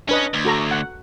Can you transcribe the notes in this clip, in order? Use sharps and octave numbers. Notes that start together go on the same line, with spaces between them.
C#4 D4 B4 D#5
D2
F#4 A4 A#5
F#5